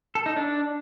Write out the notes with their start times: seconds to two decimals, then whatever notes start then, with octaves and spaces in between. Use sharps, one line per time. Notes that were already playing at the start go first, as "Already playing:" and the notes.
0.15 A4
0.26 D#4
0.36 D4